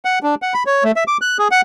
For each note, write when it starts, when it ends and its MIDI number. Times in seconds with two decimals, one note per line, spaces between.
0.05 0.19 78
0.23 0.35 62
0.42 0.54 78
0.54 0.63 83
0.66 0.84 73
0.84 0.92 57
0.96 1.04 76
1.08 1.17 86
1.21 1.37 90
1.39 1.48 68
1.51 1.61 78